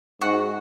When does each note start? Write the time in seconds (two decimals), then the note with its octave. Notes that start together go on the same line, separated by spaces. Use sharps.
0.21 G#2 F#4